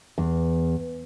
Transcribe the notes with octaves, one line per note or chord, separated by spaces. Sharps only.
E2